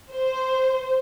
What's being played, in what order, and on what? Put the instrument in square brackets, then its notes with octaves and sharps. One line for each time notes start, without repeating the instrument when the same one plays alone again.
[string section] C5